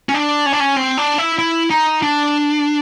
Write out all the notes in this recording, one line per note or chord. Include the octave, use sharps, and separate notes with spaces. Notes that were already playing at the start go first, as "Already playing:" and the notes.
C#4
D4
C#4
D4
C#4
C4
D4
E4
E4
D#4
D4